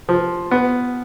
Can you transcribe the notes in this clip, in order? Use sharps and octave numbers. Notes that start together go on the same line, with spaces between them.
F3
B3